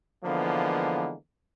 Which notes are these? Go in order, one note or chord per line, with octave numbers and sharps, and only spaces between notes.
D3 E3 F3 G#3 A#3 B3